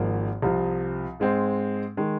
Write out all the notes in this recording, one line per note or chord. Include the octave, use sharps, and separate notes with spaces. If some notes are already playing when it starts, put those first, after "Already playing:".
Already playing: G#1 G#2 F3 A#3
C2 C3 F3
G#2 G#3 C4
D#3 G#3